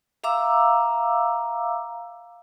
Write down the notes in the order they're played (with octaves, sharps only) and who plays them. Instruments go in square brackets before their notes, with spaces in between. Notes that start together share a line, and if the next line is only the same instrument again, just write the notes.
[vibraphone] E5 F5 A#5 D6 E6